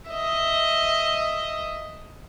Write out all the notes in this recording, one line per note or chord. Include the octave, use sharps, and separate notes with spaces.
D#5 E5